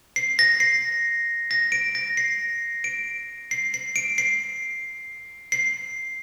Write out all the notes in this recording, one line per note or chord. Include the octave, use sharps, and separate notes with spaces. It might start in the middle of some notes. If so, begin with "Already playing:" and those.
C7
A#6
C7
A#6
D7
A#6
C7
D7
C7
C7
D7
C7
C7